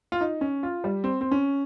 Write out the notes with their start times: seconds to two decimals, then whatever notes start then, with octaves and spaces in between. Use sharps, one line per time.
0.12 F4
0.21 D#4
0.41 C#4
0.63 F4
0.84 G3
1.04 C4
1.21 C4
1.32 C#4